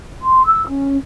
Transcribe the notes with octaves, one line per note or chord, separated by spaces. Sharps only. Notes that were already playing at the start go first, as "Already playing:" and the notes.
C6
E6
C#4